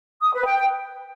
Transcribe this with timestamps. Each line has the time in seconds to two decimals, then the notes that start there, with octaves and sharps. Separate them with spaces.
0.21 D#6
0.33 B4
0.45 G5